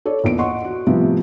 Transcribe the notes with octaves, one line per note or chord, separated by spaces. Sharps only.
A4 C#5 D5
A#1 E2 D7
D#5 F#5 C6 C#6
F#4
A2 C3 F3 G3 B3